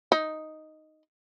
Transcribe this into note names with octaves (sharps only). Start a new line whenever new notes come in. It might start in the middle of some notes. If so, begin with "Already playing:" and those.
D#4